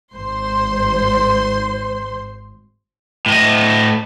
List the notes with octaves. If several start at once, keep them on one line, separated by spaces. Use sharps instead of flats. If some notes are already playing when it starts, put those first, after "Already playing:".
G#1 C5 C6
A2 D#5